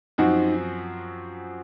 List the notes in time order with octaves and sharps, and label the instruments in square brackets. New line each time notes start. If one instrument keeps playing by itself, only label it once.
[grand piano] F#2 F3 C4 F#4 [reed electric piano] D#4